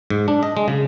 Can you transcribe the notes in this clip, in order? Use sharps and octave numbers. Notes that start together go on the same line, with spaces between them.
G#2
D4
D#5
G#3
C#3